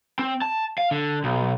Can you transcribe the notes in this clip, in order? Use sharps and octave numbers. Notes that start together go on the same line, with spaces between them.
C4
A5
F5
D3
B1